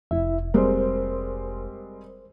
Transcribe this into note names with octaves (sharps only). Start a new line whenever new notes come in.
F1 E4 E5
G3 G#3 C4 A#4 C5